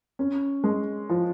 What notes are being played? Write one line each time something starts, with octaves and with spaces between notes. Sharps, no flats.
C#4
G#3
F3